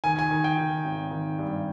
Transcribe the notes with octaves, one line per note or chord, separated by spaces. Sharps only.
D#3 G#5
G#5
D#3
G5
D#3
G#1
D#3
G2